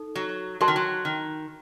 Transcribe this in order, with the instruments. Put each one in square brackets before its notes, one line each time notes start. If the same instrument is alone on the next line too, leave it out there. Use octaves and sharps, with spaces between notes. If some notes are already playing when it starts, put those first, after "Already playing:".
Already playing: [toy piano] D#4 A4
[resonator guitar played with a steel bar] F#3
[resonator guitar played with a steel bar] F#3 [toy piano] F#4 A#4 D#5 A5 C6
[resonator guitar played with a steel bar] D#3
F#3
D#3